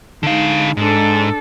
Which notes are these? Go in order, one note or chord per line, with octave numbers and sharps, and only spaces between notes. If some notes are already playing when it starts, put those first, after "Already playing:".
D3 G#3 D#4 F5
G#2 D4 A4